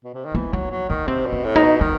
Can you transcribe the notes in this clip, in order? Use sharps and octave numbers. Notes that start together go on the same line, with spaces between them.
B2
C3
D#3
E3 B3
F#3 D#4
F#3
D#3 D#4
C3 C4
B2
C4
A2
D#4
B2
D#3 D#4